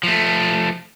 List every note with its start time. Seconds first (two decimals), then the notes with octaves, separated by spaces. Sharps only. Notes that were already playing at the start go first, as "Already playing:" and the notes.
0.03 F3 A3